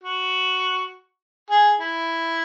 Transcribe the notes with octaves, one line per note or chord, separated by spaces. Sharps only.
F#4
G#4
E4